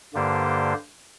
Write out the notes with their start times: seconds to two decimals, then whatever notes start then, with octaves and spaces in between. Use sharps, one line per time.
0.14 G2 D3 A#3 G4 C5